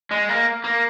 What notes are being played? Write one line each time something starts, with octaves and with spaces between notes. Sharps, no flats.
G#3
A#3
A#3